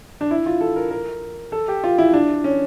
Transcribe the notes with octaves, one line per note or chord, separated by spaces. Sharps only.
D4
E4
F4
A4
A#4
A#4
A4
G4
F4
E4
D4
C#4